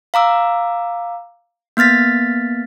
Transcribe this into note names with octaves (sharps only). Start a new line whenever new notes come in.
F5 A#5 D6 E6
A#3 B3 F6 A6 B6